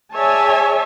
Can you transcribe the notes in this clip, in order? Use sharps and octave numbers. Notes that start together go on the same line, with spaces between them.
G#4 C#5 D5 E5 G#5 A5